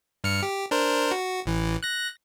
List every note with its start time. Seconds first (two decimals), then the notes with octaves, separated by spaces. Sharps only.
0.24 G2 F6 C#7
0.43 G4
0.71 D4 A#4 C5
1.11 F#4
1.46 A1 E3
1.83 F#6 A#6